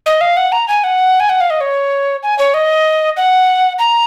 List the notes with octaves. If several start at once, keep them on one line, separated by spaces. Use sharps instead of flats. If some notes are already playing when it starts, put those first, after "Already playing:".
D#5
F5
F#5
A#5
G#5
F#5
G#5
F#5
F5
D#5
C#5
G#5
C#5
D#5
F#5
A#5